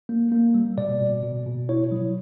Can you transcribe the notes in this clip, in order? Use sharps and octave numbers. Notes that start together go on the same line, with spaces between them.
A#3
A#3
G3
B2 D5
B2
B2
B2
E4 C#5
F#3